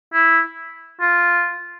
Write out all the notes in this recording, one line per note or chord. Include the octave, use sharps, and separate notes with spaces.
E4
F4